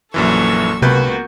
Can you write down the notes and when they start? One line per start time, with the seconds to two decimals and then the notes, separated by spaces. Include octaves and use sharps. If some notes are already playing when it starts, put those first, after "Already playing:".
0.14 A#1 F#2 E3 F#3 A#3 A4 C#6 E6
0.82 C#2 C3 A#3 B3 F#4 B4 G6